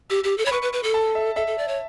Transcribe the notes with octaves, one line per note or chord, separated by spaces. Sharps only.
G4 E6
G4
A4
C#5 B5
B4 C#6
B4
B4
A4
A5
E5
A4 E5
A4
D5
C#5